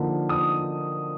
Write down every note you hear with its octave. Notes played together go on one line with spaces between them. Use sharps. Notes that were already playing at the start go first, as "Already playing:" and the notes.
Already playing: D3 F3 A#3 D#4
D#6